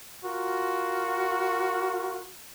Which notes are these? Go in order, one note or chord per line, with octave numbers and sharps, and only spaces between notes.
F4 F#4 A#4